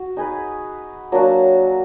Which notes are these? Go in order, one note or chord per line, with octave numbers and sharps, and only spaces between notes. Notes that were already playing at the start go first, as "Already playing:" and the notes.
Already playing: F#4
D#4 G#4 B4 D#5
F#3 A#3 D4 F#4